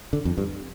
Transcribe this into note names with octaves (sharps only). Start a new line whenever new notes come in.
D3
F2
G2